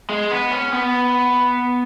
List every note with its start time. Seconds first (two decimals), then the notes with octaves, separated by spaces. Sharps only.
0.10 G#3
0.31 B3
0.51 C#4
0.72 B3